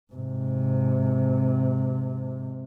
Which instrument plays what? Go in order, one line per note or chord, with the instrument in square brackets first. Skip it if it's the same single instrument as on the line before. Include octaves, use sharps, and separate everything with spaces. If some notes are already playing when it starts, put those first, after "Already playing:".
[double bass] G#2 C3